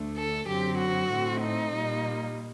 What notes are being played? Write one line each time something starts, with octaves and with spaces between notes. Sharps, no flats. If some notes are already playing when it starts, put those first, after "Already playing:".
Already playing: D2 D3 A3
A4
F#2 D3 F#3 C4 G4
F#4
A2 A3 C4
D#4
A#2 G3 A#3